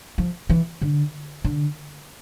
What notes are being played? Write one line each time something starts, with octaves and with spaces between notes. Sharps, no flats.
F3
E3
D3
D3